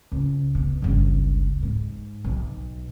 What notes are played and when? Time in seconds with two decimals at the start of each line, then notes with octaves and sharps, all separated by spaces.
0.12 C#2
0.55 B2
0.82 G1 C#2
1.63 G#2
2.24 B1